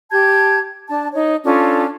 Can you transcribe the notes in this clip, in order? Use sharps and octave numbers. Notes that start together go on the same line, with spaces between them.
G4 A5 G6 G#6
D4 A5
D#4 C#5
C#4 D4 F4 A4